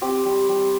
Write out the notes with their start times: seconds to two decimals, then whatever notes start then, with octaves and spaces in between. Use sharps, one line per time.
0.02 C4 G4
0.26 G3
0.49 G3